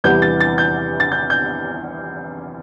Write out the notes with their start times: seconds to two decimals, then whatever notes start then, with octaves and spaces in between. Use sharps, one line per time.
0.04 E2 C3 E3 G3 B3 G6
0.22 A6
0.40 A6
0.58 G6
1.00 A6
1.12 G6
1.30 G6